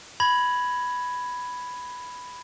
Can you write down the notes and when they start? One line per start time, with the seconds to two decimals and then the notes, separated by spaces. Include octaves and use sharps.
0.20 B5 G#6 A#6 F7 F#7